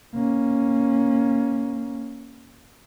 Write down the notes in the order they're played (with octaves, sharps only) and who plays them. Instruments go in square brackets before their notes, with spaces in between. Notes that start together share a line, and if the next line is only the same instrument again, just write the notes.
[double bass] A#3 C#4